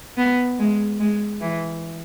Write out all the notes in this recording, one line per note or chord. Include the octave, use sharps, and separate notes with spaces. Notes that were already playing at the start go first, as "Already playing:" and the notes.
B3
G#3
G#3
E3